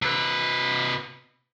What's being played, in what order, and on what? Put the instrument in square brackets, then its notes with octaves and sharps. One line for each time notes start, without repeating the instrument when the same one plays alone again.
[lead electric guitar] C3 B4